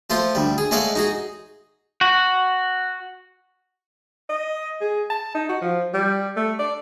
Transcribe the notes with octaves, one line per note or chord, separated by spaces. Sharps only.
F3 A3 F4 C5
D2 G3
G#4
G#3 A3 C#5 D5 F5 F#5
D#4 F#4 G#4
F#4
D#5
G#4
A5
D#4
F#4
F3
G3
A3
D5